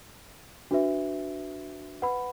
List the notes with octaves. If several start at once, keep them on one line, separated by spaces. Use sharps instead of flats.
D4 F#4 B4 E5
B4 F#5 B5